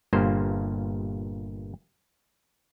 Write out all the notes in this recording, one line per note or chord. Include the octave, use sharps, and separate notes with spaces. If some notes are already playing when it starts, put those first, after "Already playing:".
G1 G2 A#2 A#3 C5